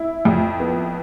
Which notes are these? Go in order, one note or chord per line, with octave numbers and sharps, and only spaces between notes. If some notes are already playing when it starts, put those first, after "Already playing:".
Already playing: E4
F2
B3